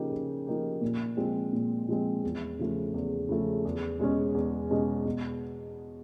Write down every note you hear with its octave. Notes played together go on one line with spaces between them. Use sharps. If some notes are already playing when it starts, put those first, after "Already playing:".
Already playing: C#3 F3 A#3 D#4 G4
C#3
F3 A#3 D#4 G4
A#2
F3 G#3 C4
A#2
F3 G#3 C4
E2
C#3 F3 A3
E2
C#3 F3 A3
E2
B2 G#3 C#4
E2
B2 G#3 C#4
B2